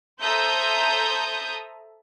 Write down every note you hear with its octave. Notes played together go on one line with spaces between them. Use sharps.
A4 C5 E5 A#5 D#6 G6